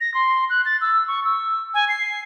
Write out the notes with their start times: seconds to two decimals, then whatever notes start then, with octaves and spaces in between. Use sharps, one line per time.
0.01 A#6
0.14 C6
0.50 F#6
0.65 A6
0.81 E6
1.08 C#6
1.24 E6
1.74 G#5
1.89 C7